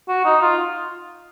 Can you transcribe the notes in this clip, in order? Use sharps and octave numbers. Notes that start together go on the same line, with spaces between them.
F#4
D#4
F4